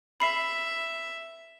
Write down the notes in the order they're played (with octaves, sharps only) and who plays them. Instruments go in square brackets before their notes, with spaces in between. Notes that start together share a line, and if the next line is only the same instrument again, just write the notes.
[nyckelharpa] E5 [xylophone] B5 C7